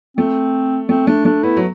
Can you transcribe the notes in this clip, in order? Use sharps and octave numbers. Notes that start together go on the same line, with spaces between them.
A3 C4
A3 C4
A3 D4
A3 D4
B3 E4
F#3